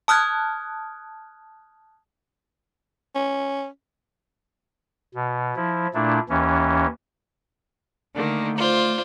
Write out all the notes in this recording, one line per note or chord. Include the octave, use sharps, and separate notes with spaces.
A5 D#6 F6 F#6 G#6
C#4
B2
F3 E4
A#2 A3 D4 E4
D#2 E3 C#4
D3 D#3 A3 A#3
F4 C5 D5